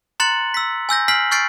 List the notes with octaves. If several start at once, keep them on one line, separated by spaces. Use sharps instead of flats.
A#5 C6 F#6 A6 C#7 F#7
E6 B6
G#5 E6 G6 A#6
G#5 F6 B6 C7 F#7
C#6 F6 G6 A6 C7 D7